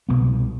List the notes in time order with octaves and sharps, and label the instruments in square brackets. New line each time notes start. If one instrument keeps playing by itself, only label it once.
[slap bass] C2 B2 B3